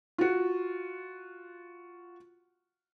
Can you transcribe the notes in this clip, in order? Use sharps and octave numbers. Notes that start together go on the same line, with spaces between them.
F4 F#4